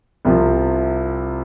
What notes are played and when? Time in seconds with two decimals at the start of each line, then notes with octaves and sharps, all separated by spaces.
0.25 C2 C3 F3